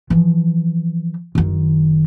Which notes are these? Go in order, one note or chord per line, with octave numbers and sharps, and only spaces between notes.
E3 F3
F#1 D#3